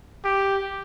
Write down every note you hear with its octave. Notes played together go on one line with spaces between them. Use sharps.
G4